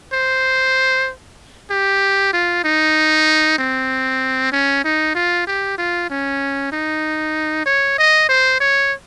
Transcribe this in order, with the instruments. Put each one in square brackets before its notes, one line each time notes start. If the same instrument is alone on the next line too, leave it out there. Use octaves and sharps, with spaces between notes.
[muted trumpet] C5
G4
F4
D#4
C4
C#4
D#4
F4
G4
F4
C#4
D#4
C#5
D#5
C5
C#5